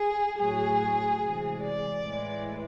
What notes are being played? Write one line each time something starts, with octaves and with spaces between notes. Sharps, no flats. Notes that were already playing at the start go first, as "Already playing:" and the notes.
Already playing: G#4
A2 F#3 G#4
C3 E3 G#3
D5
A2 E3 G#3